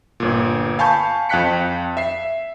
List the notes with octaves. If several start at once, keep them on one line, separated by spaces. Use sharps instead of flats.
G1 A#2
F5 G#5 A5 B5 C#6 G6
F2 F5 G5 F#6 B6 C#7
E5 C7